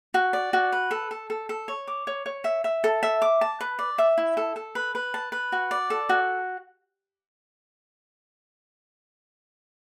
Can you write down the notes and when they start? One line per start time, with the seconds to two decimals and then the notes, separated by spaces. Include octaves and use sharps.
0.14 F#4
0.33 D5
0.53 F#4
0.72 B4
0.91 A4
1.11 A4
1.30 A4
1.49 A4
1.68 C#5
1.88 D6
2.07 C#5
2.26 C#5
2.44 E5
2.64 E5
2.84 A4
3.03 E5
3.22 D6
3.41 A5
3.61 B4
3.79 D5
3.98 E5
4.18 E4
4.37 A4
4.56 A4
4.75 B4
4.95 B4
5.14 A5
5.32 B4
5.52 F#4
5.71 D5
5.90 A4
6.09 F#4